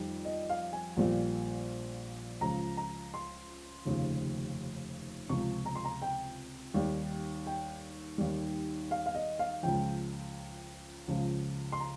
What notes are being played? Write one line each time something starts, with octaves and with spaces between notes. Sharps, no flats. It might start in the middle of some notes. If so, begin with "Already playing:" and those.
Already playing: F2 D#3 G3
D#5
F5
G#5
A#1 A#2 G3
C#2 C#3 F3 A#5
A#5
C6
F1 D#2 C#3 F3
C#2 C3 F3 C#6
A#5
C6
A#5
G5
D#2 D#3 G3
G5
D#2 D#3 G3
F5
F5
D#5
F5
C#2 C#3 F3 G5
C#2 C#3 F3
C6
A#5